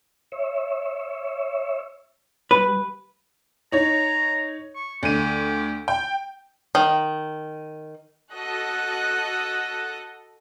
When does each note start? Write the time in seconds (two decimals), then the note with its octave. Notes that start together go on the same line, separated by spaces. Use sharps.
0.32 C#5 E5
2.51 G3 B4
3.72 D#4 C#5 A#5
4.76 C#6
5.03 D2 G4 D#7
5.88 G5
6.75 D#3
8.33 F#4 A4 D#5 F#6